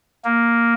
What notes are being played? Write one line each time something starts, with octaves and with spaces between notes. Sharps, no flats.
A#3